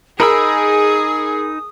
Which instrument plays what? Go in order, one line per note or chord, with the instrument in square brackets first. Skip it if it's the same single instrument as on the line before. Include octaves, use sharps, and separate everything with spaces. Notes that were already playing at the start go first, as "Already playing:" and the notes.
[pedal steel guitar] D#4 B5 E6 [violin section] G#4 [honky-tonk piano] A#4 [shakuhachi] D#6